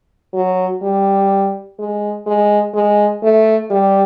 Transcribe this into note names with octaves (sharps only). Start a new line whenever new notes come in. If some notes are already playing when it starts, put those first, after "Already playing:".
F#3
G3
G#3
G#3
G#3
A3
G3